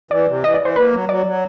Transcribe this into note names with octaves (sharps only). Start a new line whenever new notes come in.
E3 D5
C3
E3 D#5
D5
E3 C5
A#3 B4
F#3
F#3 D5
F#3